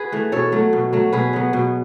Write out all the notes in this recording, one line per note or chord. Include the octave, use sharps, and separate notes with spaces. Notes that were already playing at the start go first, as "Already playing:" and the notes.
Already playing: F#4 G#4 B4
E3 A3
B2 A4 C#5
F#3 A3
B2
F#3 A3
B2 G#4 B4
F#3 B3
B2